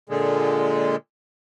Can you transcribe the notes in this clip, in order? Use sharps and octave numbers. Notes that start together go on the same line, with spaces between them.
A#2 D3 G#3